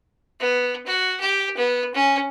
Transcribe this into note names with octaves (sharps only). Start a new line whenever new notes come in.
B3
F#4
G4
B3
C#4